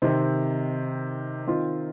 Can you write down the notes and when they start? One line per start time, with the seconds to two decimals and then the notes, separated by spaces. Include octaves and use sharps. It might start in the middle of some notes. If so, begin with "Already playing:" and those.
0.02 C3 D#3 C4
1.47 D#3 C4 F4